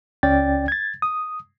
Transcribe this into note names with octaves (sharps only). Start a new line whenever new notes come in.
C#2 C#4 D5 G5 A6
G#6 A6
D#6